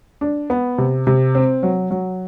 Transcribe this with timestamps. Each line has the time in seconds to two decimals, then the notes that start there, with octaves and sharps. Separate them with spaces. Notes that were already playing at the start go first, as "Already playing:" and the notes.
0.21 D4
0.50 B3
0.78 C3
1.07 C3
1.35 C4
1.63 F#3
1.91 F#3